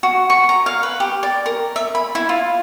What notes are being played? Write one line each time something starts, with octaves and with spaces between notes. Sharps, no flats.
F#4
C#6
A#5
F5
B4
G4
D5
A#4
E5
B5
E4
F4